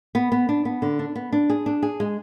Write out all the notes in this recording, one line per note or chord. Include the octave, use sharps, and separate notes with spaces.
B3
B3
D4
B3
D3
D4
B3
D4
G#4
D4
G#4
G#3